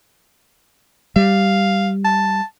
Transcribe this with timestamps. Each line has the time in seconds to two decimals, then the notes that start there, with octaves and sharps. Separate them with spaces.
1.16 G3 F5
2.05 A5